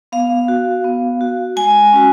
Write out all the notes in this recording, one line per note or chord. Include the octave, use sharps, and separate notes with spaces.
B3 F5
F#4
B3
F#4
G#3 G#5
C#4 F#4